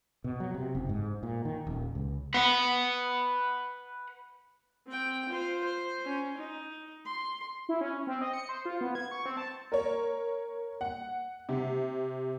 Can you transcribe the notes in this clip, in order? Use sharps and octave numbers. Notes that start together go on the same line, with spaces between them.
B2
F#3
C3
F#1
G#2
A#2
D#3
D#1
C#2
B4 F#5
C4 G5
F4 C5
C5
C#4
D#4
C6
E4
C#4
C4
D#5
C#7
C5
F4
B3
G#6
C#6
C4
A5
A#4 C#5
F#5
C3